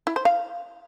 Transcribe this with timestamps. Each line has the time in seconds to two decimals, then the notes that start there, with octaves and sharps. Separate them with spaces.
0.07 E4
0.16 C5
0.25 F5